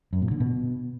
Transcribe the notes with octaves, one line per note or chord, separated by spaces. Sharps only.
F#2
A#2
D3
B2